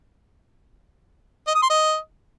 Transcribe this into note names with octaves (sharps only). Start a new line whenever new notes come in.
D#5
D#6
C6
D#5